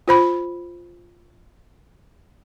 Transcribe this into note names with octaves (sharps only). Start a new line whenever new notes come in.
F4 C5 B5